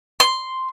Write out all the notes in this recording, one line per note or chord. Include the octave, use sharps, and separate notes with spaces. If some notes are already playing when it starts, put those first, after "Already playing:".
C6